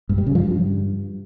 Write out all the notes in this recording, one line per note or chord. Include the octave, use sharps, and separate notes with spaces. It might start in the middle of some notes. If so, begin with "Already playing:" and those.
G2
G3
C#3
F3
G2